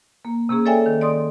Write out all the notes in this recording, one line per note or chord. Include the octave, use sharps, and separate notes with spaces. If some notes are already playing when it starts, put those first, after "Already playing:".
A#3
C3 A#3 C#4 G#4
A4 C#5 D5 E5 G5 G#5
D#3
D5 C6 D#6